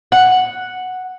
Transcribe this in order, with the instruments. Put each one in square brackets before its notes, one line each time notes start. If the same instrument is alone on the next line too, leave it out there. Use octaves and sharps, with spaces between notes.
[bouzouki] F#5